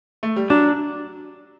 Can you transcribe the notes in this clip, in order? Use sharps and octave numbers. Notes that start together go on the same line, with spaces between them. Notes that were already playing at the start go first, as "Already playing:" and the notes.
A3
G3
F#3 D4